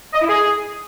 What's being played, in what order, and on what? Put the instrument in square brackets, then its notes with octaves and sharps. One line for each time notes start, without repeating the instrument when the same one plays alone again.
[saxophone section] D#5
E4
G#4